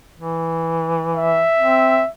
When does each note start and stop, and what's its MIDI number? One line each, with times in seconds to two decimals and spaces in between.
0.18 1.42 52
1.16 2.09 76
1.58 2.01 60